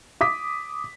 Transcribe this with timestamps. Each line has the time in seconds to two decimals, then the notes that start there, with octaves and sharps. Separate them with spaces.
0.21 D6 D#6 B6